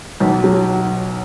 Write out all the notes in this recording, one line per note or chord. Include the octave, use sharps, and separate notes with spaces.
B1
F#3